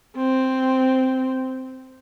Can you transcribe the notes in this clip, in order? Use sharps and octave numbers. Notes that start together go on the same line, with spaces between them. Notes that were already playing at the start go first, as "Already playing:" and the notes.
C4